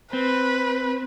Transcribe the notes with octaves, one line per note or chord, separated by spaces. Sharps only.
C4 B4